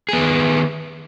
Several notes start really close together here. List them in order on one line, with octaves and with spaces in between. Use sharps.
G#4 B3 D#3